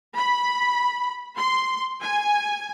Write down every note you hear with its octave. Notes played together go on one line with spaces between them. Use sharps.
B5
C6
G#5